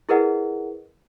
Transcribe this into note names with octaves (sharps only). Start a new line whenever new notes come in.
E4 G#4 A#4 B4 D#5 F#5